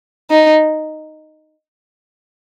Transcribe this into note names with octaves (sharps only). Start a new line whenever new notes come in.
D#4